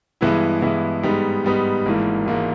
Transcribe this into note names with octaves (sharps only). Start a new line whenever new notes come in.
G2 E3 G#3 B3 E4
G2 E3 G#3 B3 E4
G#2 G3 B3 D#4
G#2 G3 B3 D#4
G#1 G#2 E3 A#3
G#1 G#2 E3 A#3